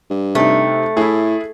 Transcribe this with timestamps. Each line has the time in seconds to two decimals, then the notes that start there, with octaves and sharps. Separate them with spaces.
0.10 G2
0.35 C3 A3 D#4
0.97 A2 E4 G#4